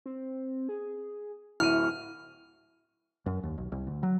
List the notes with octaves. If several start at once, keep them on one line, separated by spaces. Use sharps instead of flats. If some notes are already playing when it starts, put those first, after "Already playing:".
C4
G#4
D1 E4 C#6 F6 D#7
F#2
D#2
B1
C2
D2
F#3